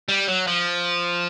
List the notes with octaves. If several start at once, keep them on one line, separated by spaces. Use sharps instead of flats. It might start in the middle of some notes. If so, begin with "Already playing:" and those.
G3
F#3
F3